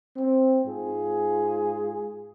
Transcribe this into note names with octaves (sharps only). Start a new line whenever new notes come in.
C4
G#2 F4 G#4